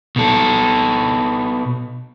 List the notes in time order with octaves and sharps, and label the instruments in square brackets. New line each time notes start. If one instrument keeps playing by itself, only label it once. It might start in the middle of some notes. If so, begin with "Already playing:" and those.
[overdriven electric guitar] B2 A4